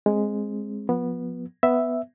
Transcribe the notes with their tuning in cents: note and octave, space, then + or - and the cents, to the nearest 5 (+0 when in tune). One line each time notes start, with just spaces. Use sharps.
G#3 +0 C4 +25
F3 +25 B3 -15
B3 +5 E5 +0